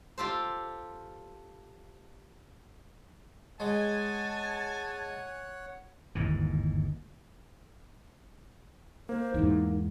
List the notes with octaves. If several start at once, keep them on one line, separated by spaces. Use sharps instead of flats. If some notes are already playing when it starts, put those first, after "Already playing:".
F4 G4 A4 C5
G#3 C#5 F#5 G#5 A5
G1 D#2 G#2 E3
A#3 C5
E2 G#2 D#4